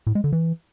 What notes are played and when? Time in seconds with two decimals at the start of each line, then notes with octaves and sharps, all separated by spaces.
0.07 A2
0.15 G#3
0.24 D3
0.33 E3